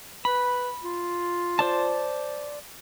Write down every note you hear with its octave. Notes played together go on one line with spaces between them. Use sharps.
B4 B5
F4
C5 D5 A5